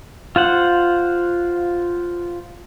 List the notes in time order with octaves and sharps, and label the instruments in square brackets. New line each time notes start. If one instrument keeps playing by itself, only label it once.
[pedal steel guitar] F4 C5 F#5